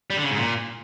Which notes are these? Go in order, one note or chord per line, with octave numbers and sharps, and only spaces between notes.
G3
D3
C#3
G#2
A#2